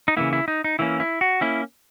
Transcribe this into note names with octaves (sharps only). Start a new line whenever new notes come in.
D#4
C#3 E3 A#3 E4
E4
D#4
D#4
E3 A#3 C#4 E4
E4
F#4
A#3 C#4 E4